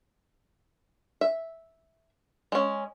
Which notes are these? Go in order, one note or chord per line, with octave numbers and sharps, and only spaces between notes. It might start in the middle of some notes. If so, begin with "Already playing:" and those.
E5
G#3 C#4